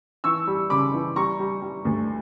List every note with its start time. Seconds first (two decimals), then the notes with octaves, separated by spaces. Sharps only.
0.24 E3 C#6 E6
0.47 G3
0.70 C#3 B5 D6
0.93 E3
1.16 G3 A#5 C#6
1.39 G3
1.62 G3
1.85 D2